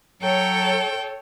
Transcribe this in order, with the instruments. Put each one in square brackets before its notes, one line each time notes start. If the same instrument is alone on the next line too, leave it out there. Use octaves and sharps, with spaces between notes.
[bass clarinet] F#3 [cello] A4 C#5 [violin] G5